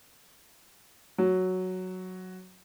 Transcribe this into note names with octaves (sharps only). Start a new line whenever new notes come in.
F#3